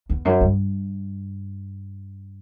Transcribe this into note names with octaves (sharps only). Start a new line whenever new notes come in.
E2
F#2
G2